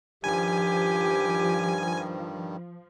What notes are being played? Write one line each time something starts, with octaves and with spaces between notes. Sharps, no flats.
G2 D#3 F3 G3 G4 G#5